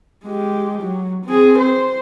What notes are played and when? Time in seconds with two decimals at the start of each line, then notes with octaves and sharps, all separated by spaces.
0.24 G#3 G4
0.82 F#3
1.25 C4 G#4
1.59 C5